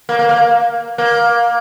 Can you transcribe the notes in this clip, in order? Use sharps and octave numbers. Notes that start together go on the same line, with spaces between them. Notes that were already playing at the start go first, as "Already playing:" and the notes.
A#3
A#3
A#3
A#3